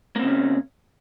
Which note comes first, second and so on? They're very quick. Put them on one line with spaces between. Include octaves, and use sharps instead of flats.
A#3 C4 C#3 C#4